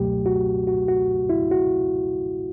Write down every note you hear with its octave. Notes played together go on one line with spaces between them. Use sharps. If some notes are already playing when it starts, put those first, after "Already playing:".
Already playing: C#2 B2 F#3 A3 G4
F#4
F#4
F#4
E4
F#4